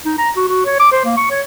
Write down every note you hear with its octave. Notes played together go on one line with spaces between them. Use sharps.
D#4
A#5
F#4
F#4
C#5
D6
C5
A#3
C#6
C#5